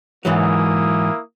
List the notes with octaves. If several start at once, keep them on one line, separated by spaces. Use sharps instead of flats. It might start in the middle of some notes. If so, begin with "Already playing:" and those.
G#2 E3 F#3 A#3 E4 D#6